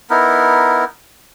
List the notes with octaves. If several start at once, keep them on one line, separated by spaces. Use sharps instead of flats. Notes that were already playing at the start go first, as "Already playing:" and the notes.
B3 D#4 E4 A#4